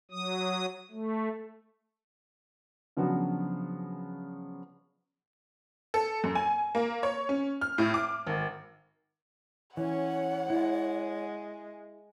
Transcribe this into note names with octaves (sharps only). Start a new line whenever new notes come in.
F#3 D#6
A3
C#3 F3 F#3 B3 D4 F#4
A4
F#2
G#5
A#3
C#5
C#4
F6
A2
D6
G#1
E3 C#4 C#5 F#5
G#3 E4